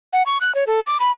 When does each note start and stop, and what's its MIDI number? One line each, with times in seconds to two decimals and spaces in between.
0.13 0.23 78
0.26 0.38 85
0.41 0.54 90
0.55 0.64 73
0.67 0.80 69
0.87 0.98 86
1.00 1.11 83